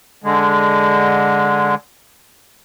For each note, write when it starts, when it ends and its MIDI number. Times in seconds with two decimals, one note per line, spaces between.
0.24 1.75 50
0.24 1.75 56